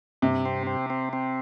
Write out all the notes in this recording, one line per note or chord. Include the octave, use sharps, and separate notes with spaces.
G2 C3
C4
C4
C4
C4